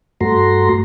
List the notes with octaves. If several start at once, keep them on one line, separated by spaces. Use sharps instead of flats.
G2 A3 F#4 A#5 C6